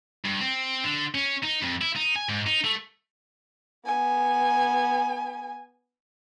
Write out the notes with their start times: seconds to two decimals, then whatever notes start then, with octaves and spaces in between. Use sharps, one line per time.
0.25 G2
0.40 C4
0.84 D3
1.15 C#4
1.43 D#4
1.62 F2
1.81 E4
1.96 D#4
2.16 G#5
2.29 G#2
2.47 D#4
2.65 A3
3.86 B3 G#5